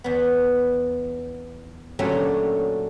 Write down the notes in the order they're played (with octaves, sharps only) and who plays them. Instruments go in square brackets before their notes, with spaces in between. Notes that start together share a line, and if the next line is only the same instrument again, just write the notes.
[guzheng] E2 B3
A#2 D3 F#3 A3 C#4 G4